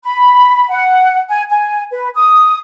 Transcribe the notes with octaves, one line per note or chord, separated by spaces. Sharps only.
B5
F#5
G#5
G#5
B4
D#6